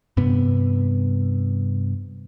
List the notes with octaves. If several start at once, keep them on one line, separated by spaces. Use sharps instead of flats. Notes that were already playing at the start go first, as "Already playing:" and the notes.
G2 C3 B3